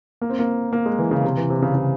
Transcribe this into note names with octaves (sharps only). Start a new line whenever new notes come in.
A#3
C4
A#3
A#3
G#3
E3
C#3
C3
E3
C3
C#3
C#3